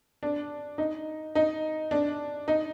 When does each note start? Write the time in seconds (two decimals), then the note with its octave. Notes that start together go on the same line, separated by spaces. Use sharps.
0.23 D4
0.78 D#4
1.35 D#4
1.91 D4
2.48 D#4